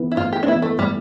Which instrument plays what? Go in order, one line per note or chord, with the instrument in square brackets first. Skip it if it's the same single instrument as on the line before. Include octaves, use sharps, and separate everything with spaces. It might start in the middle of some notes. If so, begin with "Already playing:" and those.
Already playing: [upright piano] E3 B3
[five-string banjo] E4
[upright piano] A2 [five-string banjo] F4
[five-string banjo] G4
D4
[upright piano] B3 [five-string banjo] E4
[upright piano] E3
[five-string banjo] A3
[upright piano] A2 [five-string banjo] G3